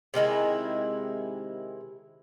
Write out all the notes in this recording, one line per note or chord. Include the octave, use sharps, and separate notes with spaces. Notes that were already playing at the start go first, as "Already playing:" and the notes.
C3 D#3 G#3 E4